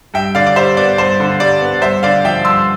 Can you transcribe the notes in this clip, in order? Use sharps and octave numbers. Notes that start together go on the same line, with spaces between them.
G2 E5 G5
D3 D5 F5
D5
G3 C5 E5
B3 D5
G2 C5
D3
G3 D5
B3
G2 C5 E5
D3 D5 F5
F3 E5 G5
G2 C6 E6